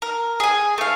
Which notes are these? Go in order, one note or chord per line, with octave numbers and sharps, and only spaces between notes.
A#4
G#4 G#5
A3 F5